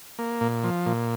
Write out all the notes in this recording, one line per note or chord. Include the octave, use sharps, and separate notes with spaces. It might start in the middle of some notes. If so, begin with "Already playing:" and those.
A#3
A#2
F3
A#2